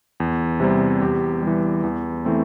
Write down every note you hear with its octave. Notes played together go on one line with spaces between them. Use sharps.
E2
C3 G3 C4
E2 G4
E3 G3
E2
E3 A3 C4